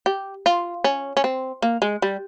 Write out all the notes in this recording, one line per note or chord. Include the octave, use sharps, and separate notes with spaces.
G4
F4
C#4
C#4
C4
A#3
G#3
G3